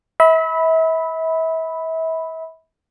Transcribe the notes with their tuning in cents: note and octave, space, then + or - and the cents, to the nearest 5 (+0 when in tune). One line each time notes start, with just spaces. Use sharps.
E5 -35 B5 +0